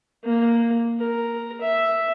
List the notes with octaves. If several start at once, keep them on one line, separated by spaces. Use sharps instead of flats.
A#3
A#4
E5